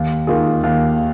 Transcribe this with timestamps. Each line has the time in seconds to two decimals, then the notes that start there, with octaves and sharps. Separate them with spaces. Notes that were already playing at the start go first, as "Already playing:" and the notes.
Already playing: D#2
0.27 D#3 A#3 F4 G#4
0.63 D#2